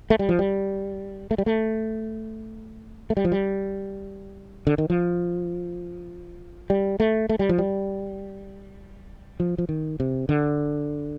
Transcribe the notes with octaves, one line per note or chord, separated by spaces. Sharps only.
A3
G3
F3
G3
A3
G3
A3
A3
G3
F3
G3
D3
D#3
F3
G3
A3
A3
G3
F3
G3
F3
F3
D#3
C3
D3